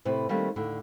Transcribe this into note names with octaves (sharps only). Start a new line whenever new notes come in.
A2 C3 B4 C5
D#3 G3 A3 A#3 C4 D4
D#2 A2 D3